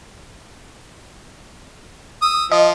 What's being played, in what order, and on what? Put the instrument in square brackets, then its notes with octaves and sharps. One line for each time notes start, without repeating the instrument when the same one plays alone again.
[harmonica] D#6 E6
[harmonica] F3 [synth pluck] D#5